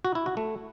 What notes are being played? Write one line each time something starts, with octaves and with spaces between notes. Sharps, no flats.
F#4
E4
F#4
A3